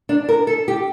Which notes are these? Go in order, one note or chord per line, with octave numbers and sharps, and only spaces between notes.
D4
A#4
A4
G4